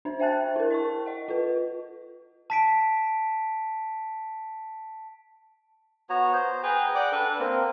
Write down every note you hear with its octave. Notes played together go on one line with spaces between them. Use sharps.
D4 C5
C5 E5 G5 A5 F#6 A6
E4 A#4
D#5 A5 C#6
D#5 F#5
F4 B4
A5 B6 D7
B3 F#4 C#5 A#5
C5
G#4 B4 G5 A#5
D5 F#5 G5 D6
D4 A4 B4
A#3 C4 A#4